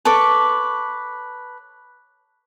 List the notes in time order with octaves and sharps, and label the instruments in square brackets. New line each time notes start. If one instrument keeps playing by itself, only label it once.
[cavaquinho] A4 B4 C#5 D6